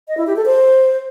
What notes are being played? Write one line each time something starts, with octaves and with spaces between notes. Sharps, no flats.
D#5
E4
G4
A4
C5